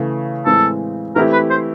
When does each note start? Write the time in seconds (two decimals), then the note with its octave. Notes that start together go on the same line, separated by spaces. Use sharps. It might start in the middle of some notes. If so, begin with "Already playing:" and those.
Already playing: C#3 E3 A3
0.45 A2 E3 G#3 C4 A4
1.15 E3 A3 C4 E4 G4 A#4
1.33 B4
1.50 C5